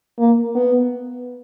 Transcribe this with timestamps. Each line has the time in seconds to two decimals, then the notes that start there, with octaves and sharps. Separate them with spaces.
0.19 A#3
0.55 B3